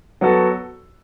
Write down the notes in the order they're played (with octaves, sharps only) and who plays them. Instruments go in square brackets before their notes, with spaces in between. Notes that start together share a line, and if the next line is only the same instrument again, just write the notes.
[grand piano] F#3 B3 F#4 A4